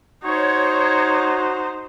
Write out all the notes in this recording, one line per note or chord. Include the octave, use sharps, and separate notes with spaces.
D#4 F#4 C5 C#5